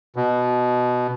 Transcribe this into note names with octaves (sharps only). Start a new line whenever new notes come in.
B2